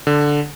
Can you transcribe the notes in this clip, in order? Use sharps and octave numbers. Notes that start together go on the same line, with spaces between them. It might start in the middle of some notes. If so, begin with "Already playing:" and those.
D3